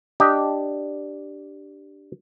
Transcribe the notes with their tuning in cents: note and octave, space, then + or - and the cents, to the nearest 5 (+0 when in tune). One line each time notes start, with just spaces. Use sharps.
D4 +0 G4 -5 D#5 +0